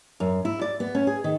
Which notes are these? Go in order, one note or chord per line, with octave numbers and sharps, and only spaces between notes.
F#2
E4
D5
B3
C#4
G#4
D#3